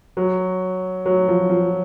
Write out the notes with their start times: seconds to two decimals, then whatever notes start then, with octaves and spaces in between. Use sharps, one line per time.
0.17 F#3
1.06 F#3
1.28 F3
1.50 F3